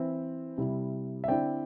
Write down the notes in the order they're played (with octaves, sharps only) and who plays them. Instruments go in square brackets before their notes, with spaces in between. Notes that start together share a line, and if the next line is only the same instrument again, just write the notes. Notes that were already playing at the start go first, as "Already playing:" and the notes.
Already playing: [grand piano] E3 C4 E4
C3 G3 E4
E5
D3 C4 E4 D5 G5